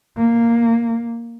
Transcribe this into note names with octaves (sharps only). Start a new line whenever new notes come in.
A#3